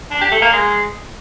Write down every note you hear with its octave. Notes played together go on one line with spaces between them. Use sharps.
D4
G4
A3
A#3
G#3